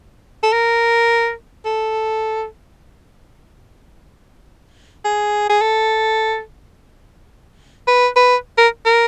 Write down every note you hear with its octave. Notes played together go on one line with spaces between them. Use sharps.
A4
A#4
A4
G#4
G#4
A4
B4
B4
A#4
A#4